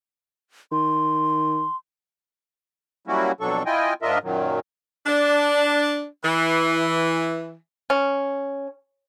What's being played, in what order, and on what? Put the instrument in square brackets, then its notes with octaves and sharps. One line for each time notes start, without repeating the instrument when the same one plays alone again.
[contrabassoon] D#3 [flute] C6
[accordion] F#3 G3 A#3 C#4 E4 F#4
F2 B2 F#3 D4 A4 C#6
E4 F4 D#5 G5 G#5
G#2 D4 F4 A#4 D#5 E5
F#2 A#2 D#3 F#3
[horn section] D4
E3
[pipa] C#4